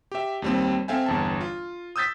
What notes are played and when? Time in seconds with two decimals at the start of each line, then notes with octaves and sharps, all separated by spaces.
0.12 G4 E5
0.42 D#2 G3 C4
0.88 C4 A4 E5 F5 G5 G#5
1.06 G1 E2 A5
1.41 F4
1.96 D#6 E6 G6 A6 B6